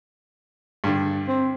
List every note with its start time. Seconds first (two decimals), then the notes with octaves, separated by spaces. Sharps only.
0.84 G2 D3
1.28 C4